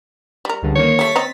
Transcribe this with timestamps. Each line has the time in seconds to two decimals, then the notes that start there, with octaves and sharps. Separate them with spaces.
0.45 G3 A#4
0.62 C#2 G2 D3
0.75 D#3 A#3 C#5
0.99 G3 A3 A6 B6
1.16 C4 D#5 A#5